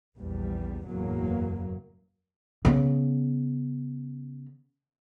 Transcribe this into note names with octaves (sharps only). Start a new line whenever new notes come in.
A#1 E2 G3
F#1 E2 A2 F#3 A#3
C#3 B3